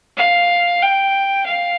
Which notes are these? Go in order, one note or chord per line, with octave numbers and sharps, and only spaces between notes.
F5
G5
F5